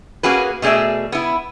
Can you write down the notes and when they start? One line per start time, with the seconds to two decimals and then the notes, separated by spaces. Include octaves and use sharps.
0.23 A#3 C#4 F#4 G#4 B4
0.62 B2 A3 G#4 D5 E5
1.12 B3 E4